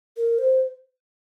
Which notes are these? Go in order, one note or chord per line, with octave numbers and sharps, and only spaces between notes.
A#4
C5